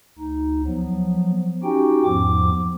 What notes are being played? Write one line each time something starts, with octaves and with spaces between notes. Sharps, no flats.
D2 D#4
F3 F#3 B3
C#4 D#4 F#4 G4 G5
E2 G#2 F3 B3 D6